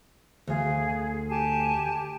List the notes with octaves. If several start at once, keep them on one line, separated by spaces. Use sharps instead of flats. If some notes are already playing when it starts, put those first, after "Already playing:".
D2 G#4 F5
G4 G#5 A5